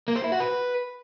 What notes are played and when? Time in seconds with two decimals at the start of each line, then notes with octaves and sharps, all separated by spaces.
0.08 A#3
0.16 C5
0.24 E4
0.32 F#4
0.40 B4